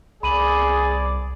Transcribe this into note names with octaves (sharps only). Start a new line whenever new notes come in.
C2 G#4 D5 B5 D#7 F#7